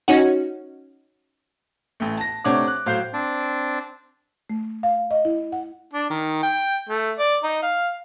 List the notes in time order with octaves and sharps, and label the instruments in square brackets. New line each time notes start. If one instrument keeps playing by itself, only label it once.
[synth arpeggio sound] C#4 D#4 F#4
[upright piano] A1 A3
A5 A#6
C3 A3 D4 C#5 F#5 D6
F#6
A2 F#3 C5 F5 G6 C7
[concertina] C4 D4
[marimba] A3
F5
D#5
E4
F#5
[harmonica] D4
D#3
G5
A3
D5
D#4
F5